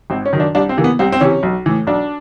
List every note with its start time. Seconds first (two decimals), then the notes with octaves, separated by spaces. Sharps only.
0.10 G#1 C4
0.25 C#4
0.33 F#2 D#3
0.40 D4
0.55 C2 D4
0.69 C4
0.76 C3 E3 A#3
0.84 B3
0.99 C2 C4
1.12 C4
1.21 C3 E3 C#4
1.43 B1
1.66 A2 E3
1.87 B1 D4